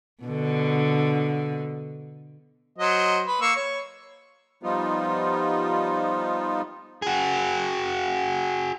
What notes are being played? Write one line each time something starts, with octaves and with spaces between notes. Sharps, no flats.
B2 D3
F#3 C5 D#5
B4
A#3 C#6 E6
C#5
F3 G3 B3 D#4 F4
F#4 G#4